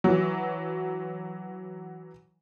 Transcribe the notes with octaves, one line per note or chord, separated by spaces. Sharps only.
E3 F#3